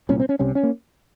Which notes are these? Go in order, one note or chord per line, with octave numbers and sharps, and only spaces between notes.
C2 A#2 C#4
C4
C#4
C2 C3 C#4
C#4
A#3